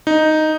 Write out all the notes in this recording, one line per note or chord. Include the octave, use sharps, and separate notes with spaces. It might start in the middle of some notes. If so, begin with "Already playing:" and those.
D#4